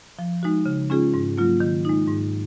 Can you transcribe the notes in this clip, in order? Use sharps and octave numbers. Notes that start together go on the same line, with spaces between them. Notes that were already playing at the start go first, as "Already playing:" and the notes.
F3
G#3 D#4 F#4
C#3
G#3 C#4 F4 G#4
G#2
F#3 A#3 F4
D#3
G#3 D#4
G#2